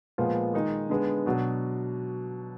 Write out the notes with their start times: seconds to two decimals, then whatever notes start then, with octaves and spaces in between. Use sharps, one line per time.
0.18 A#2 F3 G#3 B3 F4
0.54 D#3 G#3 D#4
0.89 D3 G#3 B3
1.26 B2 F#3 D4 F#4